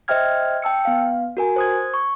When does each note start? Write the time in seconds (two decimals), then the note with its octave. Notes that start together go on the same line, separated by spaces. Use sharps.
0.08 C5 D#5 E5 G5 F6 G#6
0.62 G5 A5 E6 C#7
0.85 B3 F5
1.37 F#4 A#4 G#5
1.56 C5 D#6 G#6
1.94 C#6